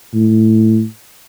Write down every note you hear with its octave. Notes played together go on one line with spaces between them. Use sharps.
A2